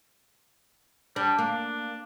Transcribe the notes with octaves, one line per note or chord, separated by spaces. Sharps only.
G3 D4
A#3 D4